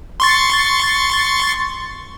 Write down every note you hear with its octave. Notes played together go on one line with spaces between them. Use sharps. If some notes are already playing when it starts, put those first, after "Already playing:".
C6 C#6 A6